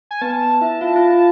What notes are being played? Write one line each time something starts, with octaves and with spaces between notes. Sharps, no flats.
G#5
B3 B4 A5
E4 E5
F4 F5
F4 F5
F4 F5